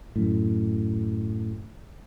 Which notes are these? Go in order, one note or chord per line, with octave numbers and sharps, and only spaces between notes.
F#2 A2